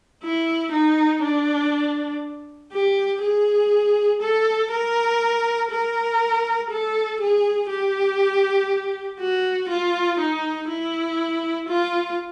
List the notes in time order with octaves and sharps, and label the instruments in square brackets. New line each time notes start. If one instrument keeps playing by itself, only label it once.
[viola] E4
D#4
D4
G4
G#4
A4
A#4
A#4
A4
G#4
G4
F#4
F4
D#4
E4
F4